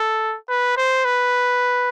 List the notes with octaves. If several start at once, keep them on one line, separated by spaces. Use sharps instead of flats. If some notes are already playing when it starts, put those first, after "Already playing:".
Already playing: A4
B4
C5
B4